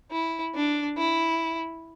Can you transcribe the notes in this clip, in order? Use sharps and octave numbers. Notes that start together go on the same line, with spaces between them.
E4
D4
E4